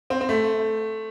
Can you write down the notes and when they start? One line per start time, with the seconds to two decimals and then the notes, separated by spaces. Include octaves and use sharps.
0.10 C4
0.21 C4
0.29 A3